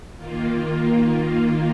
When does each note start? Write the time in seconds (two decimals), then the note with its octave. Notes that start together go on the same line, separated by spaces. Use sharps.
0.17 D#3 A#3 F4